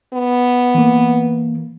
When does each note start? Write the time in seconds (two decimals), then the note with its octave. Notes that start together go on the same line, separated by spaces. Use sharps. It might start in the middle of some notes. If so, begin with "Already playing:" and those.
0.13 B3
0.75 E3 A#3